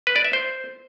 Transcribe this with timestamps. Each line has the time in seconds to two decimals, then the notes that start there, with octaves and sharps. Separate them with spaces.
0.07 B4
0.16 D5
0.25 E5
0.33 C5